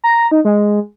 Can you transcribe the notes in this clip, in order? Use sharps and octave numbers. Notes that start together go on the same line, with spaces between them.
A#5
D#4
G#3